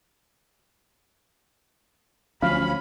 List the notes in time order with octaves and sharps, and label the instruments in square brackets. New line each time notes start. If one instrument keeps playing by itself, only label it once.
[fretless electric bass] D2 F3 F#3 [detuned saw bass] C#4 [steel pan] F5 [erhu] B5